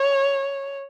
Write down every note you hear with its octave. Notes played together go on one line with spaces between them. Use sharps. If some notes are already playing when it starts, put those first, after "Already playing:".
Already playing: C#5